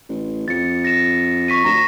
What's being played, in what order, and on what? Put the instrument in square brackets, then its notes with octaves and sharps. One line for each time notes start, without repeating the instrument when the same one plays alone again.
[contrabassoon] A1
[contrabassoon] F2 [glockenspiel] A6 C#7
[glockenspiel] A#6 E7
C#6 B6 D#7
[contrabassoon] D2 [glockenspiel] A#5 A#6 E7